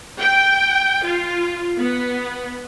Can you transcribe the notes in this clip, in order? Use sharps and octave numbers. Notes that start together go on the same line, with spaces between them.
G5
F4
B3